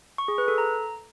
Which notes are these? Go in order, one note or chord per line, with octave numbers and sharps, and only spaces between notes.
C#6
G#4
B4
A4
A#5